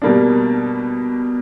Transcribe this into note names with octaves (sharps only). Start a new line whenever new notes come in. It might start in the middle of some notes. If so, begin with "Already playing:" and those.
B2 G3 A#3 D4